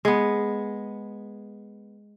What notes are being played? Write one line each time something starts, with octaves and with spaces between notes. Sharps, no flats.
G#3 B3